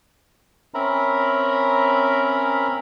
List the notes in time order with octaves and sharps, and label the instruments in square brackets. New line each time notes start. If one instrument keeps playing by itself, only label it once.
[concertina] C4 C#4 A#4 E5 A#5 B5